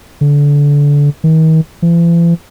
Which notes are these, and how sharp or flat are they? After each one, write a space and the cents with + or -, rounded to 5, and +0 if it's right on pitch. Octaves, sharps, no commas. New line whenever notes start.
D3 -25
D#3 +40
E3 +45